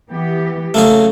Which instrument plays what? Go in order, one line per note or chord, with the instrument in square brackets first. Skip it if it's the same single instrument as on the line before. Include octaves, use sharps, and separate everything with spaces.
[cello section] E3 B3 G4
[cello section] C#3 F#3 [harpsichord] A3 A#3 G#4